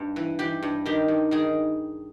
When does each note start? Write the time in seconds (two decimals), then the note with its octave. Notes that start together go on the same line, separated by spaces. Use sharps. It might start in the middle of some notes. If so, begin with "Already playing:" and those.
Already playing: G2
0.16 E3
0.39 E3 G4
0.62 G2
0.86 D#3 G4
1.08 G2
1.31 D#3 G#4